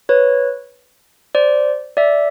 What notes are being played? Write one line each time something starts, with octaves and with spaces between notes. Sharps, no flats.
B4 C#5
C5 D5
D5 E5